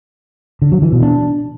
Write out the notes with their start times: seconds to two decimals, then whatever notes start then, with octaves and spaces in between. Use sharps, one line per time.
0.62 D3
0.72 F#3
0.82 E3
0.92 B2
1.03 D4